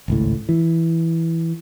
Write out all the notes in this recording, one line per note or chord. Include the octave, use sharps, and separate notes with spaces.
G#1 C#2 A2
E3